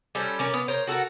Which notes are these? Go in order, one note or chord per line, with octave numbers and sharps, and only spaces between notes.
G3 C#4 A4 C5
A#3 C#4 D5
B3
A#4 C5 C#5
F#4 A4 A#4 F#5